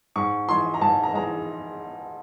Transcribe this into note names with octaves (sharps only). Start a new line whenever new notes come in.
G#2 C#6
E3 G#3 C6
A#5
G#2 A5
A#5
E3 G#3 A#5